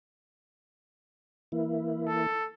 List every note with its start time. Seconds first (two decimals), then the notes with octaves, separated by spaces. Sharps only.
1.52 E3 A#3 E4
2.07 A4